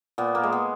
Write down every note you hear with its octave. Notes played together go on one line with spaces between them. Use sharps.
A#2 B3
A#3
G#3
B3